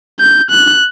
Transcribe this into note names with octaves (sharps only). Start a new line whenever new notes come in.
G6
F#6